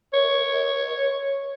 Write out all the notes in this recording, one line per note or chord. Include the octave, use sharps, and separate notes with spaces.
C#5